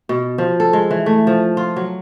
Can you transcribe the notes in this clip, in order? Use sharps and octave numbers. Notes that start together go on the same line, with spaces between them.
B2
F3
A4
G#3
E3
A3
F3
F4
F#3